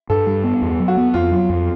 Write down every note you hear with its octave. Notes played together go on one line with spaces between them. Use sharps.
G2 A4
G3
B3
E2
F#3
F#4
B3
F2 F4
F#3
F2